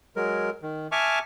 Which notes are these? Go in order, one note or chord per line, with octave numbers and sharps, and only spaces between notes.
F#3 G#3 A#4
D#3
E5 G#5 A5 C#6 D6 F6